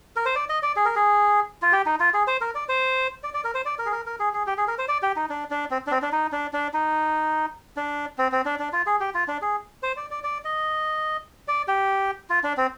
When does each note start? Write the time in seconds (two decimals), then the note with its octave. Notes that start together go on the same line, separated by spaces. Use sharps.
0.16 A#4
0.26 C5
0.35 D5
0.49 D#5
0.63 D5
0.76 G#4
0.85 A#4
0.96 G#4
1.62 F4
1.72 G4
1.86 D#4
2.00 F4
2.14 G#4
2.27 C5
2.41 A#4
2.55 D5
2.69 C5
3.23 D5
3.34 D5
3.44 A#4
3.54 C5
3.65 D5
3.79 A#4
3.86 G#4
3.92 A#4
4.06 A#4
4.19 G#4
4.34 G#4
4.47 G4
4.58 G#4
4.68 A#4
4.78 C5
4.88 D5
5.03 G4
5.16 D#4
5.29 D4
5.50 D4
5.71 C4
5.87 D4
5.91 C4
6.02 D4
6.12 D#4
6.32 D4
6.53 D4
6.74 D#4
7.77 D4
8.18 C4
8.32 C4
8.45 D4
8.59 D4
8.73 F4
8.86 G#4
9.00 G4
9.14 F4
9.28 D4
9.42 G#4
9.83 C5
9.97 D5
10.11 D5
10.24 D5
10.45 D#5
11.48 D5
11.68 G4
12.30 F4
12.43 D4
12.57 C4